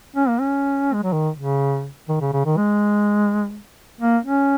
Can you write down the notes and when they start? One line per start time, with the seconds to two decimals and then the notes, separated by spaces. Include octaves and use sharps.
0.16 C#4
0.28 A#3
0.40 C#4
0.94 G#3
1.03 F#3
1.13 D#3
1.37 C#3
2.09 D#3
2.21 C#3
2.33 C#3
2.45 D#3
2.57 G#3
4.01 A#3
4.25 C#4